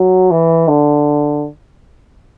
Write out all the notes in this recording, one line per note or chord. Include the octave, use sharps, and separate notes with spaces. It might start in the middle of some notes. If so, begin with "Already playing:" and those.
Already playing: F#3
E3
D3